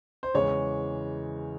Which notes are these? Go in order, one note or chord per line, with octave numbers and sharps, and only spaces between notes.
C5
E2 C#3 E3 G#3 C#5